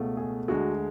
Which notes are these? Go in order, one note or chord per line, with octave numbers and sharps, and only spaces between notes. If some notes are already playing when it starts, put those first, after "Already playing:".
Already playing: C#2 B2 A3
G#4
D2 D3 G#3 F#4